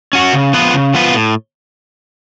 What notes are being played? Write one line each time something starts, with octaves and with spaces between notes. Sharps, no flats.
C#4 F#4
C#3
F3 B3 F4 B4
C#3
F3 B3 F4 B4
A2